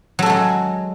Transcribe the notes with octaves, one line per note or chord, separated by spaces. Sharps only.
F#3 G#3 F#4 A4